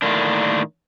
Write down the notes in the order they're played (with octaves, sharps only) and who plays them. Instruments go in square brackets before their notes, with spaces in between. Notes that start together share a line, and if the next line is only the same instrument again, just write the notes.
[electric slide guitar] A2 D3 D#3 A#3 D4